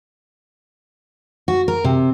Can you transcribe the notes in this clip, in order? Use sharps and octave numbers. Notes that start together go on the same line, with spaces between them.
F#4
A#4
C3